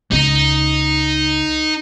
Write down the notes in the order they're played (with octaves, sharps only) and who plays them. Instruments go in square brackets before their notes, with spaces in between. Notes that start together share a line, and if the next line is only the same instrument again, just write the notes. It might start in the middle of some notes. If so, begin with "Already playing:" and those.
[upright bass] C#2 [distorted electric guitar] D#4